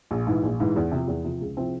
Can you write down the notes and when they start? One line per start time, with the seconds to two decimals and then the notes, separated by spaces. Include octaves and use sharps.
0.11 A#1
0.27 G#2 E3
0.43 A#1
0.60 G#2 E3
0.76 E2
0.91 C3 F3
1.08 E2
1.24 C3 F3
1.41 C#2
1.57 C3 F3 C4 E4